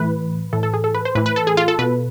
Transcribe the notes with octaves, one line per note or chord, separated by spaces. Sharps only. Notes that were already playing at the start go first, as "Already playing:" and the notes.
Already playing: A2 E3 B4
A2 E3 A4
A4
G#4
A4
B4
C5
A2 E3 B4
B4
A4
G#4
F4
A4
B2 B4